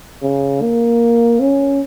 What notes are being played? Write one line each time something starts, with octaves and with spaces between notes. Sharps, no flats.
C#3
A#3
C#4